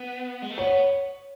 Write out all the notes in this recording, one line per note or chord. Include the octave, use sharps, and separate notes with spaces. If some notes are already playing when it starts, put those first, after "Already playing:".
Already playing: B3
G#3
A3
B3 C#5